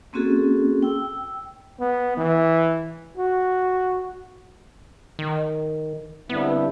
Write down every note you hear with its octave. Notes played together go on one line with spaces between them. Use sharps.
A#3 C4 C#4 F#4 G#4 A4
G5 E6
B3
E3
F#4
D#3
G2 D3 B3 C4 E4